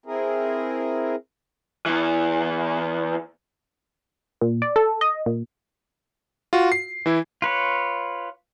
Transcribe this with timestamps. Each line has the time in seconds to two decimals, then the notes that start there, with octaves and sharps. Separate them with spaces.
0.06 C4 E4 G#4 A#4
1.86 E2 E3
4.41 A#2
4.62 D5
4.76 A4
5.01 D#5
5.26 A#2
6.53 F4 F#4
6.72 C7
7.06 E3 E4
7.42 F4 B4 C#5